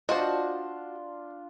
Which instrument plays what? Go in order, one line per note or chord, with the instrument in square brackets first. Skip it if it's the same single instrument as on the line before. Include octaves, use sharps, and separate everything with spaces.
[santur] D4 F4 [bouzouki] F#4 A5 [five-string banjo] C5 D#5